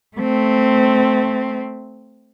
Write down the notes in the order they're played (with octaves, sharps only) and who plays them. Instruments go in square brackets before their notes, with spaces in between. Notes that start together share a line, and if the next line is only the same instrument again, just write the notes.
[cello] A3 C4